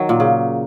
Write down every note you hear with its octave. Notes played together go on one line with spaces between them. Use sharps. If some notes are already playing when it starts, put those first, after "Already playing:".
Already playing: D#3 F#3
A#2
C#3